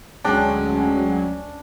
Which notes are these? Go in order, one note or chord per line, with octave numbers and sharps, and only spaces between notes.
D2 F#3 G#3 C#4 D4 G5